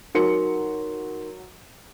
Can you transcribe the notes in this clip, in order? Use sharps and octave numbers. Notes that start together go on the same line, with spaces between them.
F#3 D#4 A#4 C6 C#7